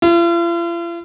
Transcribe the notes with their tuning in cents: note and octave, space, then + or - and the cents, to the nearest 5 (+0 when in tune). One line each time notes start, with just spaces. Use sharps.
F4 -45